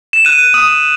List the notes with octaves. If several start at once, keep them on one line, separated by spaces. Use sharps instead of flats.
E7
F#6 D#7
D#6